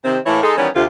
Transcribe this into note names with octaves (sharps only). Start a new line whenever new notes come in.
C3 D#3 C4
A2 E3 A3 A#3 E4 C#5
G#3 D#4 A4
D#3 E3 G3 B3 C#4
D2 C3 F4